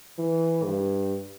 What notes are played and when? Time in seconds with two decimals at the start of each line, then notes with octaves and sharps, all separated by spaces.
0.18 E3
0.65 G2